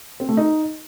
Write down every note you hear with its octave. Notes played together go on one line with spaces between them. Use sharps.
C4
A3
D#4